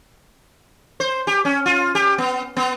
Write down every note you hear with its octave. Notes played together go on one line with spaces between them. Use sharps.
C5
G4
C#4
F4
G4
B3
B3